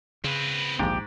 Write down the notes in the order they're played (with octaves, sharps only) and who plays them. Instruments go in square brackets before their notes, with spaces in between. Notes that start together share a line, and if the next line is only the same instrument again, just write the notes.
[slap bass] C#3 [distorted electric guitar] C4 B4
[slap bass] A#1 D#2 [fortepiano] G#2 [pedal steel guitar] G4